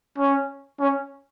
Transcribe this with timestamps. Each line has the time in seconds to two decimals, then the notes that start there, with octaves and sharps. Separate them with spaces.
0.18 C#4
0.80 C#4